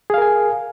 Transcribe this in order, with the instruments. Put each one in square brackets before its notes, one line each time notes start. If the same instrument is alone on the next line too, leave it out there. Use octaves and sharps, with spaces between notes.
[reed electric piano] G#4
F5
A#4
G#5